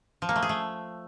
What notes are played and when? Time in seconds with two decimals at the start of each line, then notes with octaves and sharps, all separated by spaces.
0.22 F3
0.29 A#3
0.36 A3
0.42 G#4
0.49 A3